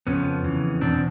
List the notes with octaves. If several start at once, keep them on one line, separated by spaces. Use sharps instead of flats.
F2 C#3 F3 B3 C#4
F2 C#3 E3
E2 B2 C4 D4